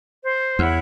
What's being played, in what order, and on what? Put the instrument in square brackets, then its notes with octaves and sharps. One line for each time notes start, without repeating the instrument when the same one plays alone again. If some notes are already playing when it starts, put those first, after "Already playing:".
[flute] C5
[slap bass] E2 [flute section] E4 C#5 F#5